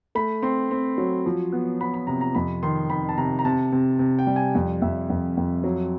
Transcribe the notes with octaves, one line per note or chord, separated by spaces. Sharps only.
A3 B5
C4 C6
C4
F#3
F3
B3
B3 B5
B5
C3 A#5
A#5
F2 B5
D#3 C6
D#3 B5
A5
C3 A#5
A#5
C3 A5
C3
C3
G5
G3
G#5
F2
F2 E5
F2
F2
F#3